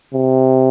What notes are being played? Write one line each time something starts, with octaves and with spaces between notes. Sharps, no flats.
C3